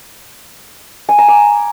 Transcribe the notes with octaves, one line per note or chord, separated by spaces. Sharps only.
G#5
A#5
D6